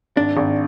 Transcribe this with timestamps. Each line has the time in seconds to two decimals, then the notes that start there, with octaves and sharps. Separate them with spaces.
0.16 G#1 D4
0.37 G#1